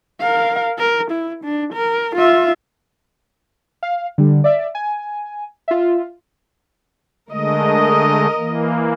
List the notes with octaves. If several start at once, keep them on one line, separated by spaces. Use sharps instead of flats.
A#4 F5
A#4
E4
D4
A#4
F4 E5
F5
D3 G3
D5 E5
G#5
F4 E5
D3 G#3 A3 A#4 D#5
E3 A#3